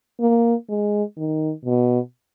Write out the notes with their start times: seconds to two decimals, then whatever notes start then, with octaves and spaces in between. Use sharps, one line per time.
0.20 A#3
0.69 G#3
1.17 D#3
1.65 B2